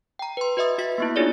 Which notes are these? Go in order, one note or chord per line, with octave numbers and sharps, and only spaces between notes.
G5 A#5
B4 C6
F#4 B4 D#5 E5 D#6
F#4 E5 B6
A#3 B3 E4
D4 D#4 F4 G#4 C#5 D5